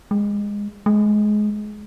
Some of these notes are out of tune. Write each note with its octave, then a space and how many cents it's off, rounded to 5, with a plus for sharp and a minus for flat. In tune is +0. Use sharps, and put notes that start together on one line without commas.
G#3 -20
G#3 +20